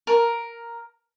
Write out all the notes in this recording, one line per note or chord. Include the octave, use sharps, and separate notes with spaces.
A#4